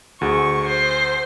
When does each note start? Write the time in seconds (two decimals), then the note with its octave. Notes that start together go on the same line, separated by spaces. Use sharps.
0.21 D2 G#4 F#5 C#6
0.67 C5